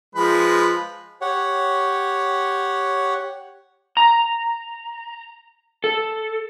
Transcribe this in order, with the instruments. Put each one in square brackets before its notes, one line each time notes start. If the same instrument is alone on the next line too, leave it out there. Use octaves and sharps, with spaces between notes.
[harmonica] F3 G#3 B4
[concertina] G4 C#5 F#5
[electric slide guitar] A#5
A4